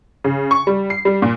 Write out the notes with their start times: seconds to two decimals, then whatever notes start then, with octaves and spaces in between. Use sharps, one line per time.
0.24 C#3
0.51 C#6
0.67 G3
0.90 C7
1.05 G3
1.22 A#2